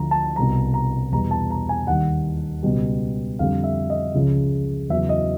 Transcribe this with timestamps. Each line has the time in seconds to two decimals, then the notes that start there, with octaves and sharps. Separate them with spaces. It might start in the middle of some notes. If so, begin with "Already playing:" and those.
Already playing: D2 D3 F3 A#5
0.11 A5
0.36 C2 B2 G3 A#5
0.74 A#5
1.12 E2 B2 G3 A#5
1.31 A5
1.50 A#5
1.69 G#5
1.87 D#2 D#3 G3 F#5
2.63 C#2 B2 G3
3.39 F2 D3 G3 F5
3.64 E5
3.90 D#5
4.14 C#2 C#3 F3
4.89 E2 C#3 F#3 E5
5.09 D#5